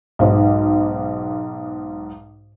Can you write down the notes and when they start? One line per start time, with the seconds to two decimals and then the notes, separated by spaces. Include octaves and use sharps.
0.19 B1 G#2